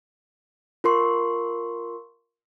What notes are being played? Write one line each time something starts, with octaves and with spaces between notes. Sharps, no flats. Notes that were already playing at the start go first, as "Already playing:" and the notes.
F4 A#4 C6 C#6